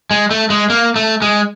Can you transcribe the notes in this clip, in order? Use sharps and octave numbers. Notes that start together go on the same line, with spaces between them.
G#3
A3
G#3
A#3
A3
G#3